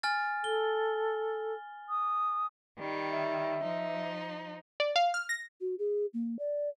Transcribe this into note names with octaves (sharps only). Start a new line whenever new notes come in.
G#5 F6 A6
A4 G7
D#6
D#3 G3
E5
F3 D#4
D5
F5
F6
A#6
F#4
G#4
A#3
D5